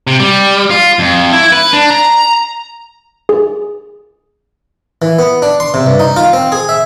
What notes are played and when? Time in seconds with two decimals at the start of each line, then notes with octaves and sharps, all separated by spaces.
0.07 C3
0.20 G3
0.71 F4
0.99 F2
1.32 E4
1.52 B4
1.73 D4
1.90 A#5
3.29 G#4
5.02 E3
5.19 B3
5.42 D4
5.60 C6
5.74 C3
5.86 G2
6.00 D#4
6.16 F4
6.33 C4
6.52 G#4
6.69 E5